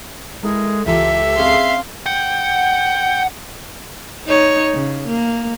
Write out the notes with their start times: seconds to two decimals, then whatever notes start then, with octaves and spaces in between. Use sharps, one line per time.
0.43 G#3 E4 A4 A#4
0.86 C#2 E3 F4 G4 A4 E5 A#5
1.37 C4 C#4 G#4 F5 C6
2.06 F#5 G5
4.26 D#4 C#5
4.74 C#3
5.07 A#3